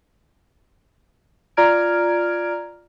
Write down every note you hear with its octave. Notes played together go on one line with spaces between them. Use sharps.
F4 D5 A#5 F6 G#6 D7